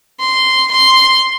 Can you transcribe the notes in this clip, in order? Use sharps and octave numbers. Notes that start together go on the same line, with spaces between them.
C6
C6